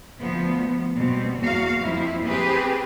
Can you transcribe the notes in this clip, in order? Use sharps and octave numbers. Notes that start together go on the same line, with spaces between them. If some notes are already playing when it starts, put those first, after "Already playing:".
D2 F3 B3
B2 G3 C4
E2 A#3 F#4 F5
F2 F3 E4
C4 G4 G#4 B4